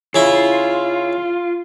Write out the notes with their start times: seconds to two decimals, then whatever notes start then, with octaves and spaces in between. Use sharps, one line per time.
0.15 C#3 E4 F4